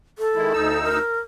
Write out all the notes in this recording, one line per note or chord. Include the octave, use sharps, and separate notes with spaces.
A4
D#3 G#3 E4
D2 D#4 E6
A#4